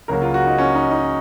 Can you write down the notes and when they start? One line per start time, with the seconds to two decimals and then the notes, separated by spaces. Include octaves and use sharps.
0.08 C#2 C#3 F#3 A#3 A#4
0.22 F4
0.34 F#4
0.47 D#4
0.58 C#4
0.75 D#4
0.91 D#4